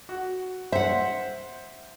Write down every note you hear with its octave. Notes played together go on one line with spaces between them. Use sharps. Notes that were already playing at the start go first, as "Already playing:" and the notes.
F#4
C5 E5 F#5